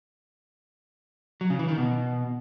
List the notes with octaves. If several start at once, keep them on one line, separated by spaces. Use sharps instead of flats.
F#3
C#3
E3
D#3
B2